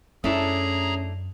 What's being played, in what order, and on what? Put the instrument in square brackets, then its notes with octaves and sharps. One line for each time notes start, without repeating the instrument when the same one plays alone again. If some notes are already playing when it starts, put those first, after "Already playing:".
[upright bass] F#2 [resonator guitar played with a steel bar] A3 D4 E4 [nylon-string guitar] C#4 [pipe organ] G#4 A#5